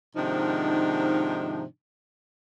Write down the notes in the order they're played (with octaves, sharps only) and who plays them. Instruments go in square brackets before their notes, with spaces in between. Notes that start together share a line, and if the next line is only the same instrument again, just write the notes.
[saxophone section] G#2 C3 D#3 F3 D4 D#4